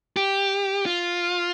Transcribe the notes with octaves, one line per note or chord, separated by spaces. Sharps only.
G4
F4